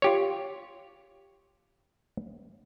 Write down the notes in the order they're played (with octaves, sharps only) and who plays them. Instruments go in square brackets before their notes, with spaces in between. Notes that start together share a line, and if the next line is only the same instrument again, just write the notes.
[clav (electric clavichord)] F4 G4 C#5